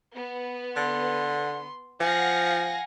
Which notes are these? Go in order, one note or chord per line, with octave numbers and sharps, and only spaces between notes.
B3
D3 C6
F3 F5 F#5 G#5 A#6